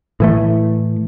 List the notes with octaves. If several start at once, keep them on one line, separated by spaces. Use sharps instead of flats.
A2 E3 A3